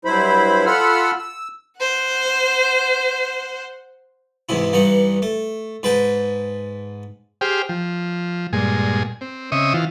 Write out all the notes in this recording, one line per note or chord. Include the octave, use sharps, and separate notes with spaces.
G2 F#3 E4 C5 B5
F4 A4 F#5 B5 E6 F6
E6
C5 F#5
E2 G#2 C3 E4
G2 E3 D#4 F#5
A3
G#2 B4 G5 A5
G4 G#4 C5 G5 F6
F3
G2 A#2 G#3 G#5
C4
C#3 C4 D#5 E5 C#6 D#6
E3 F4